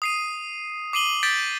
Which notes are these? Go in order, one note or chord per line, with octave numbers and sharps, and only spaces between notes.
D#6 C7 D#7
D6 C7 D#7 F#7 G7
G6 A6 B6 D7